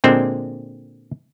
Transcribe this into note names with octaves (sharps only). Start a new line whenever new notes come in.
A#2 D3 G#3 C4